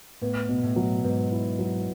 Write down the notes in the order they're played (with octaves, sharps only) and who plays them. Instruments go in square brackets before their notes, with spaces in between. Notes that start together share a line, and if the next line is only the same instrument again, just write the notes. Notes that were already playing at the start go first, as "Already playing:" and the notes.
[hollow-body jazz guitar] A2 [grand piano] B3
[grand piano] B2
[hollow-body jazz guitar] A2
[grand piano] F#3
[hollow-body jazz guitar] G#2 [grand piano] B3
[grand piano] E4
F#3